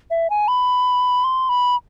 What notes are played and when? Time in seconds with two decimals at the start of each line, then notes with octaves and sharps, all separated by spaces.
0.11 E5
0.30 G#5
0.48 B5
1.24 C6
1.49 B5